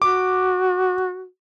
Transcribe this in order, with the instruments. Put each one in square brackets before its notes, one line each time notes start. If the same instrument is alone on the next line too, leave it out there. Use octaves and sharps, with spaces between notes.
[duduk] F#4 [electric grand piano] D6